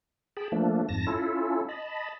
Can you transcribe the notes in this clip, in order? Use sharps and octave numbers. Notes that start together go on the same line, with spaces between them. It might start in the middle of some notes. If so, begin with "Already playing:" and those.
G#4 G5 A5 B5
F3 A3 A#3 D4
F2 G#2 A5 A#6
C#4 E4 F4 A4
D#5 A5 B5